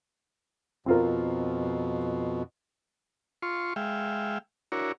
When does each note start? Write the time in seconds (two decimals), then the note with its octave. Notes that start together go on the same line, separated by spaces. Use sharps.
0.86 F2 B2 C4 F4 A#4
3.42 F4 C6 C#6
3.76 G#3 E5 F5 G5
4.72 D4 E4 F#4 A#4 C#5